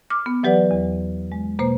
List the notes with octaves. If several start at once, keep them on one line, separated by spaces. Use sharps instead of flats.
D6 F6
B3
E3 F#3 G4 B4 D5 F#5
E2
G#3
B2 A#3 C5